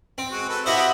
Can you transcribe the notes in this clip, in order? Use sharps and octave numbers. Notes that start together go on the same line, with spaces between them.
C4
G#3 F#4
A4 B4
E4 F#4 G4 C5 D#5 E5